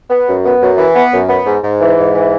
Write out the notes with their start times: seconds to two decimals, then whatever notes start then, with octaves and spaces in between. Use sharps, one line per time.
0.10 B3
0.28 F#2
0.45 B3
0.61 F#2
0.78 E3
0.95 B3
1.13 F#2
1.29 B3
1.46 G#2
1.63 G#2
1.81 E3
1.97 G#2
2.14 E3